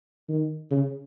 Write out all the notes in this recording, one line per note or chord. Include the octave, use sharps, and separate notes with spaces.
D#3
C#3